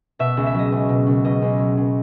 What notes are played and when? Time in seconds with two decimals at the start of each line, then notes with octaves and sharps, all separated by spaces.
0.19 B2 E5
0.37 C#2
0.46 E5
0.54 F#3 D#5
0.72 C#2
0.89 B2
1.07 C#2
1.24 B2 D#5
1.42 C#2
1.59 F#3
1.77 C#2